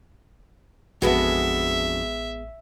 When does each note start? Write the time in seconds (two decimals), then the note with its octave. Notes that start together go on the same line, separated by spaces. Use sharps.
1.02 A1 F2 G#3 B3 D4 F#4 E5